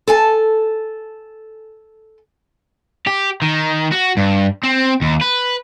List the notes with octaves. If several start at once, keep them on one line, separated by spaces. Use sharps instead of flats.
A4 G#5 A5
G4
D#3
F#4
G2
C4
D#2
B4